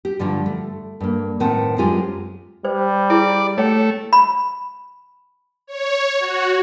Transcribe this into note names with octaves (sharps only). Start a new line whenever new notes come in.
G4
G2 D3 F3 G3
A3
G2 A#3
A2 D#3 C4 B4 F#5 A5
F#2 G#3 C4 F4 G4 G#5
G3 C5
E4 G#4 D5
A3 C#5 G5
B5
C#5
F#4